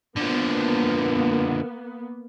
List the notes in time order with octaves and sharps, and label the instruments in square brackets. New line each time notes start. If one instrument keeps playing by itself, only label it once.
[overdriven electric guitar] D3 F3 [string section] A#3 B3